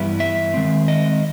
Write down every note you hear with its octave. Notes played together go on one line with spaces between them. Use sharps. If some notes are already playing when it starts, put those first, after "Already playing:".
Already playing: G2 E3 G3 B3 E4
E5
D#3 G#3 C4
D#5